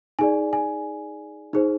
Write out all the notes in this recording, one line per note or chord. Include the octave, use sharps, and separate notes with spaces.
D#4 G#4 D5 G#5
G#5
D#4 G#4 C5